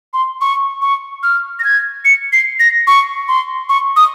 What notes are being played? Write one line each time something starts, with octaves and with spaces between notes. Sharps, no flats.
C6
C#6
C#6
F6
A#6
G#6
C#7
C7
A#6
C#6
C6
C#6
D#6